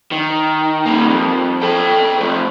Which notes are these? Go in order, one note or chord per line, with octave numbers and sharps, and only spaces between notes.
D#3
G3 A#3
F2
A4 G5
F3 A3